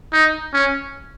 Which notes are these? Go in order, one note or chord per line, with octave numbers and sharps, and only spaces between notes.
D#4
C#4